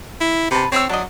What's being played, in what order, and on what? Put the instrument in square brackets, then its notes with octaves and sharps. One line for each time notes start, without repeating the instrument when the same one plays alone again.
[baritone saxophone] E4
[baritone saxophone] C3 [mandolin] B4 A5
[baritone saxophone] C4 [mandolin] C#5 B5 E6
[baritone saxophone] F#3 [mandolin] D4 D#5